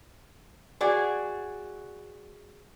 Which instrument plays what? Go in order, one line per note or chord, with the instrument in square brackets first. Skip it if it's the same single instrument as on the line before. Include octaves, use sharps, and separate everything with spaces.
[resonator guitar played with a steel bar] F#4 G#4 D5